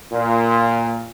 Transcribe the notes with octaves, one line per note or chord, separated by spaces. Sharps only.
A#2